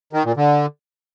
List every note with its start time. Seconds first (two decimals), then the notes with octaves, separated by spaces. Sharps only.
0.13 D#3
0.25 A#2
0.37 D3